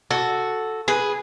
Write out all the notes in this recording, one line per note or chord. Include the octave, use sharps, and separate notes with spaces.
F#4 A4
G#4 B4